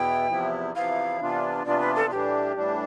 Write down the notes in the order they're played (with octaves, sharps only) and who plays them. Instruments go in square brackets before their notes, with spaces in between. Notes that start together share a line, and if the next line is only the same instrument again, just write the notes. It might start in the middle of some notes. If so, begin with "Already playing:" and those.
Already playing: [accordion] E2 B2 B3 E4 [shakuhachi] G5
[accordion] E2 C3 F3 B3 E4
[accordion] E2 C3 F3 B3 E4 [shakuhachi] F5
[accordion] C3 E3 B3 D4 F4
[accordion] C3 E3 B3 D4 F4 [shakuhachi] D5
[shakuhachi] B4
A4
[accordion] A2 E3 G3 D4 [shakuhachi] G4
[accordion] A2 E3 G3 D4